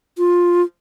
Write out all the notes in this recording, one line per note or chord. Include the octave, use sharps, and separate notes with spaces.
F4